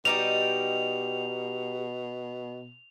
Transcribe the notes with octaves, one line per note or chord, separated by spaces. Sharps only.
B2 G3 D#4 G4 F7